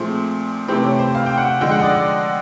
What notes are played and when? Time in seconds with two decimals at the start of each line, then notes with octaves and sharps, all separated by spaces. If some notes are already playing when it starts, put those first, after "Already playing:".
Already playing: A#2 F3 A3 C4 G#4
0.68 C3 E3 A3 C4 G4
0.84 C#5
0.99 C5
1.15 F5
1.26 G5
1.38 F#5
1.61 D3 F3 G#3 G5
1.71 F#5
1.79 D#5
1.83 D5
1.95 D5